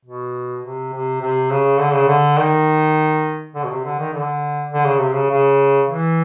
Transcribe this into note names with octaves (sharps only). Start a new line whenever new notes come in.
B2
C3
C3
C3
C#3
D3
C#3
D3
D#3
D3
B2
C3
D3
D#3
D3
D3
C#3
C3
C#3
C#3
E3